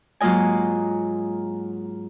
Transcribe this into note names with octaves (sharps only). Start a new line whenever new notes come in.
G#2 F#3 A#3 F4 D#5 G#5